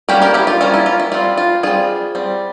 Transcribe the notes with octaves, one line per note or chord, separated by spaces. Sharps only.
G3 A#3 C#4 G4 A#4
G4 A#4
E4 G4
F4
G3 A#3 C#4 F4
E4
F4
E4
G3 C4 F4
F4
G3 C4 F4 G#4
G3 C4